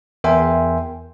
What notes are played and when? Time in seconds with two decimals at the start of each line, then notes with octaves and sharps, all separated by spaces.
0.24 E2 A#4 E5 G5 G#5 C6